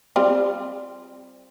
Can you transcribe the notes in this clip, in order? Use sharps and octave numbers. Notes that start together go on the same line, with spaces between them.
G3 C4 F4